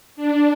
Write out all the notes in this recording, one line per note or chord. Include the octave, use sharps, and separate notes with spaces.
D4